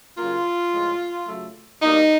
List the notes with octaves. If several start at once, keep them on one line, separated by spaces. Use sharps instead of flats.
C#3 F#3 A#3 F4
A2 F3 G#3
C#3 F#3 A3
B2 G3 A#3 D#4